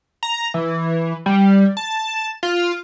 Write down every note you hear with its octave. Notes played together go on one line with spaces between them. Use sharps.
A#5
E3
G3
A5
F4